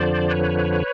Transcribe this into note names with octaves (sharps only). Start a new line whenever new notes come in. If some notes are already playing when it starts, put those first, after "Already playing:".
Already playing: F2 D3 F3 C5 D5
B4 C#5